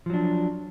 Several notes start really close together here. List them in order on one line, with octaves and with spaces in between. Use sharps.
F3 F#3 D4